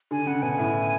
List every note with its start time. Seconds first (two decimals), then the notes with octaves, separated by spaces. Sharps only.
0.11 D3 G#5
0.27 C#3 F#5
0.42 B2 G#5
0.58 A2